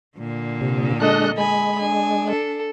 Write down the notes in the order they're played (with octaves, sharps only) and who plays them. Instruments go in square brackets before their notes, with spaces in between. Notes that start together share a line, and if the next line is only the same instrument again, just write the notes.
[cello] A#2 D3
[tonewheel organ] C3
[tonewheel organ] G#3 D4 F#6 [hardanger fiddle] A4 D#5
[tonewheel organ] G#3 [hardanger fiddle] G#5 B5
[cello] D4 [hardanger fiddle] G#5
[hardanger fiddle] A4